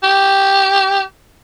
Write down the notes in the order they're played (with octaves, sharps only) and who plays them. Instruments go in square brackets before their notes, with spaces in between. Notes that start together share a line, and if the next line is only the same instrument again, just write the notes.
[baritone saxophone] G4